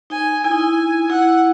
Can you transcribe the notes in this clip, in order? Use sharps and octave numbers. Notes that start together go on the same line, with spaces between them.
D#4 G#5
E4 G#5
D#4
E4
E4 F#5